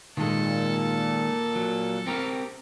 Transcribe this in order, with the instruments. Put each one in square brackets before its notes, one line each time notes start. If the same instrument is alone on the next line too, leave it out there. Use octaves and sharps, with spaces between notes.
[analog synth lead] A#2 [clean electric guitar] D#3 G#3 [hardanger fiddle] A4
[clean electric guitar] F#3
C4 G4 A#4